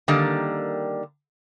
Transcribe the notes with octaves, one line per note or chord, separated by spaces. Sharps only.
D3 D#3 G3 A#3